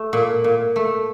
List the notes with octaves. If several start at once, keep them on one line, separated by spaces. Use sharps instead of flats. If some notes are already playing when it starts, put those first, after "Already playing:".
Already playing: A3
A#2
A#2
A3